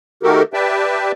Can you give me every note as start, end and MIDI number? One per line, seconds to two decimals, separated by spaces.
0.23 0.42 51
0.23 0.42 57
0.23 0.42 66
0.23 0.42 67
0.23 0.42 69
0.23 0.42 70
0.54 1.12 67
0.54 1.12 71
0.54 1.12 74
0.54 1.12 76
0.54 1.12 79
0.54 1.12 81